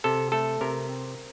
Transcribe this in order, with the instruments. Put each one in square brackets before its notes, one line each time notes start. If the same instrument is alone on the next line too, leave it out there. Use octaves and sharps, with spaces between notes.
[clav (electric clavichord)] C3 A4
A3 A4
C3 A#4
C4